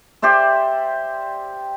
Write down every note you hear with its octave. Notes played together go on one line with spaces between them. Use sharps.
G4 C5 D5 E5